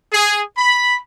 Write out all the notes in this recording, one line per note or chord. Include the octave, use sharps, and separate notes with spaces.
G#4
B5